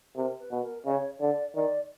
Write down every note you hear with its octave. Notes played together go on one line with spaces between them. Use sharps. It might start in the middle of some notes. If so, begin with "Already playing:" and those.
C3 A#4
B4
B2
A#4
C#3 C#5 D#5
D3 D5
D#3 D5